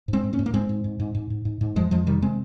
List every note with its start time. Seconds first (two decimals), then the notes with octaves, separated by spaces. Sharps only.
0.08 G#2
0.13 G#3 C4
0.23 G#2
0.33 A#3 C#4
0.39 G#2
0.46 A#3
0.54 G#2 G#3 C4
0.69 G#2
0.84 G#2
1.00 G#2
1.15 G#2
1.30 G#2
1.45 G#2
1.61 G#2
1.76 F2 F3 G#3
1.91 F2 F3 G#3
2.06 C3 D#3 G3
2.22 C3 G#3 C4